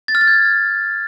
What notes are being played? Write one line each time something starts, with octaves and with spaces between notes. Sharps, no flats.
A6
F6
A6
G#6